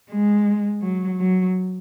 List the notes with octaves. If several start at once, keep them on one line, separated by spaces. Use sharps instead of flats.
G#3
F#3
F#3